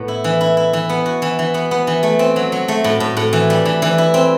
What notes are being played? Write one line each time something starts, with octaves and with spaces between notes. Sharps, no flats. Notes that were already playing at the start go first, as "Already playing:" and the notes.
Already playing: A2 B3
E4
E3
E4
E4
E3
B3
F#4
E3
E3
B3
B3
E3
A3
C4
F#3
F#3
A3
A2
A2
A2
E3
G3
E3
E3
E4
C4